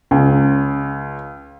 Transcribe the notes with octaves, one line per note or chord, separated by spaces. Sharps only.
C#2